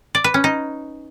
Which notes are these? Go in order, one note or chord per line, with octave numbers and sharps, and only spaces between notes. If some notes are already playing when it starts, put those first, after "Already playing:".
D5
B4
C#4
D#4